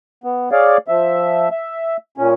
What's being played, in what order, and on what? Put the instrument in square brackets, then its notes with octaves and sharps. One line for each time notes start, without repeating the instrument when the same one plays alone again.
[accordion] B3
G#4 C#5 D5 F5
F3 E5
E5
A#2 C#4